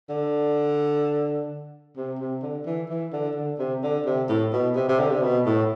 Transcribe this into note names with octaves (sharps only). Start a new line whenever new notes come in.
D3
C3
C3
D3
E3
E3
D3
D3
C3
D3
C3
A2
B2
C3
C3
D3
C3
B2
A2